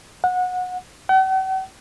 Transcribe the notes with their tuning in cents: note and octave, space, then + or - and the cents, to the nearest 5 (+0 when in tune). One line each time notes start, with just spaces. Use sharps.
F#5 -25
F#5 +45